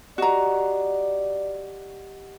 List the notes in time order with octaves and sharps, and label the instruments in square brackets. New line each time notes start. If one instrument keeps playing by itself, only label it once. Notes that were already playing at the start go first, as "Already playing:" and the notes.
[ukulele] F#4 A#5 [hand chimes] G4 D#5 F#5 [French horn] D5